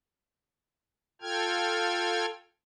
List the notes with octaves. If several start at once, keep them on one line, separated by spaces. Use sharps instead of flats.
F4 A4 G5 F6 G#6